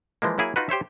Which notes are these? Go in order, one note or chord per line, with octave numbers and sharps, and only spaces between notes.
E3 F3 G#3 A#3
F#3 A#3 E4 G#4
D#4 F4 F#4 B4
G4 C5 C#5 E5